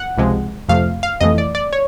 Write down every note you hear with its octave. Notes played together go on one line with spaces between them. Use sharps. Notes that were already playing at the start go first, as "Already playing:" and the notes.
Already playing: F#5
C#2 C3 F3 G#3
F2 C3 F3 A3 F5
F5
F2 C3 E3 A3 D#5
D5
D5
C#5